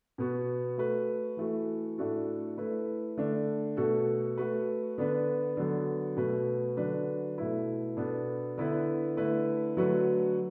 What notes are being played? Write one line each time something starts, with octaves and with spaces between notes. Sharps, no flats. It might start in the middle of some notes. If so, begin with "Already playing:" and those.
B2 B3 F#4
A3 F#4 B4
E3 A3 F#4
A2 A3 D4 F#4 A4
A3 E4 B4
D3 A3 D4
B2 A3 F#4 A4
A3 F#4 B4
D3 B3 D4 B4
D3 F#3 B3
B2 A3 F#4 B4
D3 F#3 D4 B4
B2 A3 E4 B4
B2 B3 D4 A4
D3 B3 E4 B4
D3 A3 E4 B4
D3 F#3 A3 F#4 B4